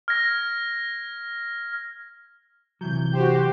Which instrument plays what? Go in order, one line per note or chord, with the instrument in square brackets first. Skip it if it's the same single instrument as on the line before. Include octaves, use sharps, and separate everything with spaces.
[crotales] F6 G#6 A#6
[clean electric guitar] C3 E3 F#3 [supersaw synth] G6
[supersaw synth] F#4 C5 [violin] G4